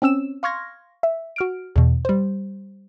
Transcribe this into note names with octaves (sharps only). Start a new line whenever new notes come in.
C4 C#4 E6 E7
F5 C6 C#6 F6 G#6 A#6
E5
F#4 F6 D7
E2 B2
G3 C5